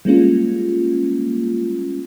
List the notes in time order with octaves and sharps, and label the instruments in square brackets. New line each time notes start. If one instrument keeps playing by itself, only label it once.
[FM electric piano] G3 G#3 A#3 C#4 F4